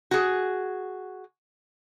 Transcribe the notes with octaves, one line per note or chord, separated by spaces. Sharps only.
F#4 G#4